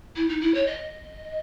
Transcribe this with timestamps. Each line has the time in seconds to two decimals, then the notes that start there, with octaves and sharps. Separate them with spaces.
0.16 E4
0.29 D#4
0.41 E4
0.54 C#5
0.67 D#5